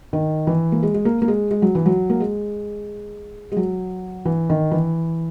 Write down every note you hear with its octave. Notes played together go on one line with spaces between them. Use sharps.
D#3
E3
A#3
G#3
G#3
A#3
A#3
G#3
G#3
F#3
E3
F#3
A#3
G#3
G#3
F#3
E3
D#3
E3